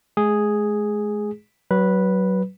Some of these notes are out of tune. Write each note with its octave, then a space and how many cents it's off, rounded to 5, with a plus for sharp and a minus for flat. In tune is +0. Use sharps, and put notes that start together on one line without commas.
G#3 +35 G#4 +0
F#3 +25 B4 -10